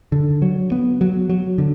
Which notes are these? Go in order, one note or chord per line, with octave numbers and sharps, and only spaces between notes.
D3
F#3
B3
F#3
F#3
D3